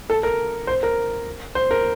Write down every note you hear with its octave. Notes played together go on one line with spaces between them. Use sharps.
A4
A#4
C5
A#4
C5
A#4